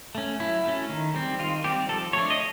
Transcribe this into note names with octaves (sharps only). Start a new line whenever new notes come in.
A3 C#4
F#3 E4
A3 C#4
D#3
G3 C4
D#3 F4
G3 C4 G4
F3 A4
A3 D4 C#5
D#5